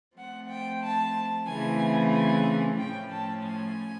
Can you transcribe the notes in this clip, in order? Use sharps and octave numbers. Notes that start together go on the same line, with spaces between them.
F3 A3 C4 F#5
G5
A5
C#3 E3 A3 C4 G#5
G#5
A2 F3 A3 C#4 G5
A5
G#5